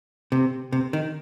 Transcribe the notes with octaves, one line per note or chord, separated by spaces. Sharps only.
C3
C3
D#3